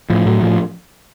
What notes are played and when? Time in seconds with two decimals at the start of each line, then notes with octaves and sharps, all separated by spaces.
0.10 A2 F3
0.26 A2 F#3
0.42 A2 F3